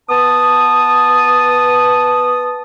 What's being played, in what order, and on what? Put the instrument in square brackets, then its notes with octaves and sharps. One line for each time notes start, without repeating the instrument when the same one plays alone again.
[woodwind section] B3 A5 D#6